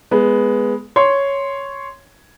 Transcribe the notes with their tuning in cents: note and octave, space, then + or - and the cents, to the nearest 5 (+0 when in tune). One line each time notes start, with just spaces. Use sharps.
G#3 +0 B3 +0
C#5 +0 C6 +0